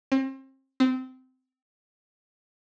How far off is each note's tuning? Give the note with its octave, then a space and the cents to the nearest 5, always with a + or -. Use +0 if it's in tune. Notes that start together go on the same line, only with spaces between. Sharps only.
C4 +35
C4 -20